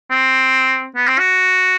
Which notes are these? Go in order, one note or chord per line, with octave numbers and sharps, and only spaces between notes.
C4
B3
C4
F#4